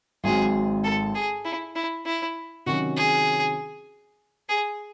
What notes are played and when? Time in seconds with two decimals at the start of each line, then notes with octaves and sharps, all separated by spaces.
0.24 G#1 G#2 F#3 C4 F#4 G#4
0.84 A4
1.15 G#4
1.45 E4
1.76 E4
2.06 E4
2.66 C3 D#3 F#3 C#4 F#4
2.96 G#4
4.49 G#4